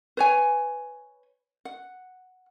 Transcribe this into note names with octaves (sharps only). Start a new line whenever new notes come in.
B4 C#5 G#5
F#5